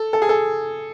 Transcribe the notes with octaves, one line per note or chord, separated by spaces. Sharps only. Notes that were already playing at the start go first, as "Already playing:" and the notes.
Already playing: A4
A4
G#4
A4